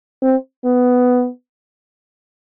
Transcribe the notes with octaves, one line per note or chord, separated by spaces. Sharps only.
C4
B3